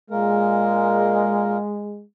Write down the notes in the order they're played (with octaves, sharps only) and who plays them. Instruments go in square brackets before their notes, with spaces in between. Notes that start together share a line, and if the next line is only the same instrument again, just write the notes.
[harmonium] A#2 A#3 A#4 [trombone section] G#3